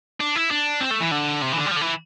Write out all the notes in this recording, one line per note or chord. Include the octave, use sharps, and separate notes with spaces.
D4
E4
D4
C4
A3
E3
D3
C3
E3
D3
G3
F3
D3
E3